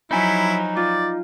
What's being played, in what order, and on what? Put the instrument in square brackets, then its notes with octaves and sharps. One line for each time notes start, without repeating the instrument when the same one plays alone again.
[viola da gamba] F3 F#3 [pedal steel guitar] D#4 [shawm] E4 [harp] G#5 B5
[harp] F4 [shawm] D5